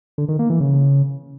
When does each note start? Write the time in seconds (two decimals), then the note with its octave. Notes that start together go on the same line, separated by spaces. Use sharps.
0.18 D3
0.29 D#3
0.39 A#3
0.50 E3
0.60 C#3